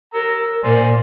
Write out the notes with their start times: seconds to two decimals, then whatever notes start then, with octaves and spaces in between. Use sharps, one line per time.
0.14 A#4 A#5 E6
0.64 A#2 C5 D5 G#5